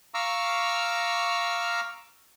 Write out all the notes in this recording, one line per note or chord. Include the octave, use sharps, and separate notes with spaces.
F5 A#5 C#6 D6 E6 F6